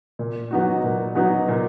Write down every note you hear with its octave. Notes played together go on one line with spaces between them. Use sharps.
A#2
F#3 B3 D#4 F#4
A#2
F#3 B3 D#4 F#4
A#2